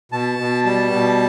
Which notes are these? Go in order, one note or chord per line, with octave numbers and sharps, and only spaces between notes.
B2 A5
B2
G3 A5
B2